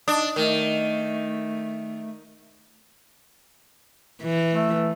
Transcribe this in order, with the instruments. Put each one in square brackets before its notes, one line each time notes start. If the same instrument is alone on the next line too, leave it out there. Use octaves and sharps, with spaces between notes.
[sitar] D4 [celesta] D#6
[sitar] D#3 [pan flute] A3 [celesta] A#4
[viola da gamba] E3
[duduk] A3